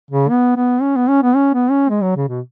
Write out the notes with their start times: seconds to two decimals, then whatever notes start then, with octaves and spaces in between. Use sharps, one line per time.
0.11 C#3
0.29 B3
0.56 B3
0.82 C#4
0.96 B3
1.09 C#4
1.23 B3
1.36 C#4
1.54 B3
1.71 C#4
1.89 G#3
2.02 F#3
2.16 C#3
2.29 B2